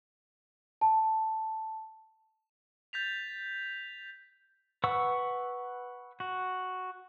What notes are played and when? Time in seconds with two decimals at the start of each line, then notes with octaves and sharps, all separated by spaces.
0.81 A5
2.93 G6 A6 B6 F7
4.84 B4 F#5 C#6 E6
6.20 F#4